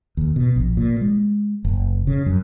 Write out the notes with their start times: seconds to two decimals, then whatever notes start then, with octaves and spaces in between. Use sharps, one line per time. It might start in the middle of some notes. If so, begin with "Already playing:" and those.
0.17 D#2
0.36 B2
0.56 A#1
0.77 A#2
1.01 G#3
1.65 F#1
2.07 C#3
2.26 F#2